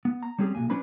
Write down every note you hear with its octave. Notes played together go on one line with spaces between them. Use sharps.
B3
A#5
G3 C4 C#4 G4 G#4
B1 C3 A#3 G#5
F#3 C#4 D4 B4 C5 B5